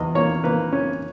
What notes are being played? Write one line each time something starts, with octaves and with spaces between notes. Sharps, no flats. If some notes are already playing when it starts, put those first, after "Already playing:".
Already playing: E2 D#5
A#3 C#5
A#3 B4
C#4